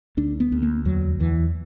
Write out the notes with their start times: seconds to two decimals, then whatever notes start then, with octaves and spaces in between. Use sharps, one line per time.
0.17 D2 D4
0.40 B3
0.52 D2
0.62 A#3
0.85 E2 F#3
1.20 E2 E3